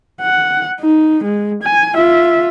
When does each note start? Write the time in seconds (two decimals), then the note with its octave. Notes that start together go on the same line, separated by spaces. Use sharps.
0.22 F#5
0.81 D#4
1.24 G#3
1.63 G#5
1.96 F4 E5